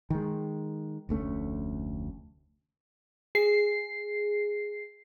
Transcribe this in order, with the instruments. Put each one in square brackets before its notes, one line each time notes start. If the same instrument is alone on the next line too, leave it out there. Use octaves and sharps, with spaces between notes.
[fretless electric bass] D#3 G#3
F1 D2 A3 C#4
[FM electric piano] G#4 C7